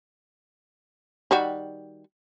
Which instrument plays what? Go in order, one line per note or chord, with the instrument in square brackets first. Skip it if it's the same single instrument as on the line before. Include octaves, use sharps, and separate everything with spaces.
[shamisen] D#3 G3 F#4